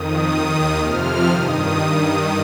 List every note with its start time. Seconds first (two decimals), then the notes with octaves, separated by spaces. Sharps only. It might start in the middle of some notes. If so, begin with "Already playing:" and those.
Already playing: F2 D#3 D#6
0.28 D#2 D#3 D#6
0.78 F2 C3 F3 F6
1.28 G2 D#3 D#6
1.78 G2 D#3